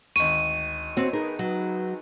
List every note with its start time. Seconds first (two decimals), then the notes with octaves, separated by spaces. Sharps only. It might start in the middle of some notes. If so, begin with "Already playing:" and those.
0.16 G#1 D2 C#6 D#7
0.97 C4 F#4 C5 C#5
1.13 D#4 G#4 A#4 B4
1.39 F#3